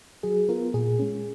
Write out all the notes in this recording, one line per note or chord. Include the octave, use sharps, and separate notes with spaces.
F#3 G#4
B3 F4 A#4
A#2 G#4
G#3 C#4